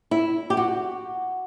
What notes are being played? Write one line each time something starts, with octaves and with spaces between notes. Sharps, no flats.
E4
G4
F#4